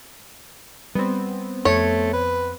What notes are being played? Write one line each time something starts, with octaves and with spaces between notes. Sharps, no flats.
G3 B3 C4
F2 A3 C#5
B4